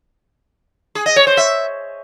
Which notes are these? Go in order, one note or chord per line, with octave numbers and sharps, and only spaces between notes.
G#4
D#5
C#5
C5
E5